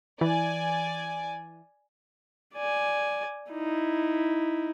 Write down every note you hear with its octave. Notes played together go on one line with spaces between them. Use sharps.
E3 D5 G#5
D5 G#5
D#4 E4